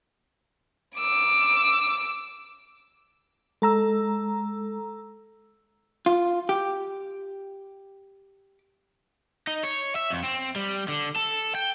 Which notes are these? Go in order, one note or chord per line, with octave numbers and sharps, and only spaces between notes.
D6 E6
G#3 A4 A#5 E6
F4
G4
D#4
C#5
E5
F2
C4
G3
D3
A4
G5